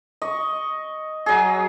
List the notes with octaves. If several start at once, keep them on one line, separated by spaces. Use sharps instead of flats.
D#5 C#6
F#3 G#4